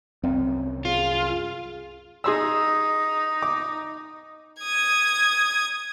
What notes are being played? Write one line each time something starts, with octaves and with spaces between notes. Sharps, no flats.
C2 F#2 C4
F4 G#4
D#4 G#4 C6 E6
D6
D#6 G#6